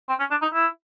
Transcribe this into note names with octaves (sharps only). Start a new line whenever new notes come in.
C4
C#4
D4
D#4
E4